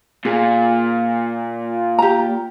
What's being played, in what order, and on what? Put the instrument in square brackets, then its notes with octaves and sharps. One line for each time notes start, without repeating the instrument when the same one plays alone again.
[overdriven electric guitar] A#2 [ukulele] G#4
[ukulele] G4 A#5